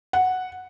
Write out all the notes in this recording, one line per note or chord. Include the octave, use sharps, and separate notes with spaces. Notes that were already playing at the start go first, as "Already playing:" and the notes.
F#5